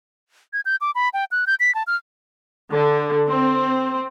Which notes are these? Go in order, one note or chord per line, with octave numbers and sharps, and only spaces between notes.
G#6
G6
D6
B5
G5
F#6
G6
B6
A5
F6
D3
C4